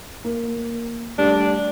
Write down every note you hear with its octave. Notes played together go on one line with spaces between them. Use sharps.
A#3
G3 A3 D4 G4